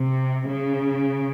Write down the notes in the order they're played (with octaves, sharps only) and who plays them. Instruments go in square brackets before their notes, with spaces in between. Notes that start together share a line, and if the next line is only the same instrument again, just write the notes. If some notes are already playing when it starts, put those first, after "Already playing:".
Already playing: [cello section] C3
C#3